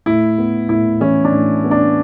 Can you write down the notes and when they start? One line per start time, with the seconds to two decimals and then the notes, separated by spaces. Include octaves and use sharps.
0.06 A2 E4
0.38 B3
0.69 A2 E4
1.00 E3 C#4
1.25 D4
1.32 A2
1.64 B3
1.71 D4